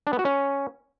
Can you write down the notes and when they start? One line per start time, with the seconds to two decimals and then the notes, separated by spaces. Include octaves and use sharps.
0.07 D4
0.13 B3
0.19 F#4
0.25 C#4